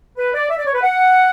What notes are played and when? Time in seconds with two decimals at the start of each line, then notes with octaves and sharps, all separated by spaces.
0.17 B4
0.34 D5
0.50 E5
0.58 D5
0.66 C#5
0.74 B4
0.82 F#5